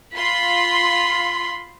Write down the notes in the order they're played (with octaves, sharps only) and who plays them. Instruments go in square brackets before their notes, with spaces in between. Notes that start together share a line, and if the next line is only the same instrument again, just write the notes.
[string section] F4 C6 [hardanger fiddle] B5